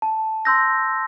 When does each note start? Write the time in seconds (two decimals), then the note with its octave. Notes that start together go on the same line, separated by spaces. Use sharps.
0.02 A5
0.45 C6 E6 G6 A#6